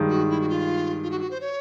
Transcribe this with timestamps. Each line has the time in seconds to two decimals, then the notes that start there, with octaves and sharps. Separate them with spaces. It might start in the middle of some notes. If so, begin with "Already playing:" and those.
Already playing: G2 D#3 G#3
0.09 F#4
0.29 E4
0.41 F#4
0.49 F4
1.03 F4
1.11 F#4
1.21 F#4
1.31 C5
1.41 C#5